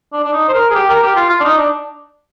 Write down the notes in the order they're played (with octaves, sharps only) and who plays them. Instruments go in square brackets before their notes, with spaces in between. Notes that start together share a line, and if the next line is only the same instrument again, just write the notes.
[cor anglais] D4
D4
D#4
C5
A#4
G#4
G4
A#4
G4
F4
F4
D4
D#4
D4